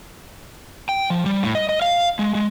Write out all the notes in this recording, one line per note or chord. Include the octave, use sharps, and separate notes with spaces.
G5
F3
G3
A2
D#5
D#5
F5
G#3
G#3